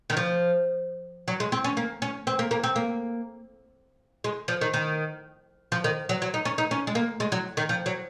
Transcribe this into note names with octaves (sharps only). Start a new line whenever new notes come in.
D#3
F3
F#3
G#3
C4
C#4
A#3
C#4
C4
A#3
A#3
C4
A#3
G#3
F3
D#3
D#3
F3
D#3
F#3
F#3
D#4
C#4
D#4
C#4
G#3
A#3
G#3
F#3
D#3
F3
F#3